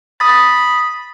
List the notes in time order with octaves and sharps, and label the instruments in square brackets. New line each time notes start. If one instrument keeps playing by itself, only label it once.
[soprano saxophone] B5 [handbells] D#6 A6